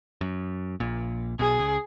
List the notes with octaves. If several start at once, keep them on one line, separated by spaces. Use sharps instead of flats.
F#2
A#1 A#2
B1 B2 G#4
C#2 C#3